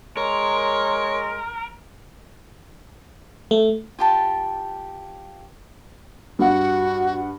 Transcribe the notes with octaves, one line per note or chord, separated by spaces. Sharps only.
G#3 A#4 C#5 C6
A3
F4 G4 A5
G2 F#4 F#5